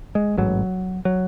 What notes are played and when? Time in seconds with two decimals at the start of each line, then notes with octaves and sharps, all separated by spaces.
0.15 G#3
0.38 A1 G#2 F#3
1.05 F#3